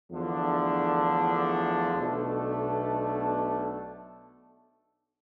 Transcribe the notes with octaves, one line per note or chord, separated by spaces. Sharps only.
E2 D3 F3 A3 D4
B1 B2 A3 D4 A4